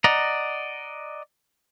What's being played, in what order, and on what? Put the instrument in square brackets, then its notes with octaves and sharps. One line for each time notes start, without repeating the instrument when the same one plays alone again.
[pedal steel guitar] D5 D#5 F#5 A#5